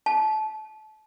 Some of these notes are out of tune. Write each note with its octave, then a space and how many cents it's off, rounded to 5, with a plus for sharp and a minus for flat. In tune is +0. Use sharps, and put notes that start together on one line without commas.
A5 -30